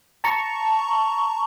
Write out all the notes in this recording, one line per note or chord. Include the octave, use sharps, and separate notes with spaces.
A5 A#5 C#6